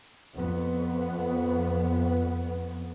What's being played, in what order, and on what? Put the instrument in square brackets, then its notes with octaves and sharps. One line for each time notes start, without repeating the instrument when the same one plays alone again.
[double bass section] F2 B3